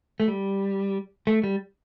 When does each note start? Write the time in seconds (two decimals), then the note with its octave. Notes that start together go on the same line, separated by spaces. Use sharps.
0.20 A3
0.28 G3
1.27 A3
1.44 G3